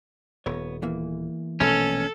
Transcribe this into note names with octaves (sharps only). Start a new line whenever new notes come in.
D#1 B3 C#5
E2 E3 A#3
A#1 B2 A3 C#4 A4